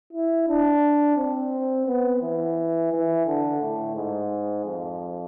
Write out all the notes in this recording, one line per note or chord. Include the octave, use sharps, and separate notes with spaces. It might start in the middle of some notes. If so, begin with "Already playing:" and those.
E4
D4
C4
B3
E3
E3
D3
A2
G#2
F2